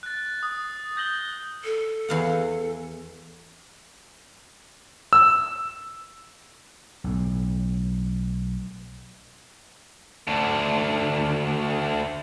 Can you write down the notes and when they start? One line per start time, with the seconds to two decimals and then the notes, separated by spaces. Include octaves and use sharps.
0.03 F#6 A6
0.43 D#6
0.96 D#6 G6 A#6 F#7 G7
1.64 A4
2.08 E2 F5 F#5
5.13 E6
7.04 B1 A2
10.27 D2 D3